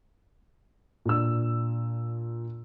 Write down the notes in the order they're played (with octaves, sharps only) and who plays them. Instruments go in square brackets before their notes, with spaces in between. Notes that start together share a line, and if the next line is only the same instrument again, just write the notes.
[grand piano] A#2 D4 E6